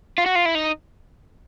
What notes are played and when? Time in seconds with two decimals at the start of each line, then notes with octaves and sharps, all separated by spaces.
0.18 F4
0.26 F#4
0.35 F4
0.45 E4
0.55 D#4